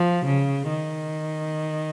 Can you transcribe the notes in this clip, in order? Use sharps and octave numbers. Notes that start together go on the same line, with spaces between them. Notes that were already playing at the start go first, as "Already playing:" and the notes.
Already playing: F3
C#3
D#3